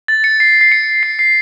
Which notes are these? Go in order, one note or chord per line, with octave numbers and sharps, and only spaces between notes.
A6
C#7
C7
C7
C#7
C7
C7